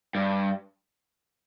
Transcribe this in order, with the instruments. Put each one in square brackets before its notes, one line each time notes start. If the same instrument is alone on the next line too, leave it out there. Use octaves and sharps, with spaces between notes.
[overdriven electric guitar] G2